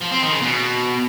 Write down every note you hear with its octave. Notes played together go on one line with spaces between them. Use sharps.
F3
C4
D#3
C#3
B2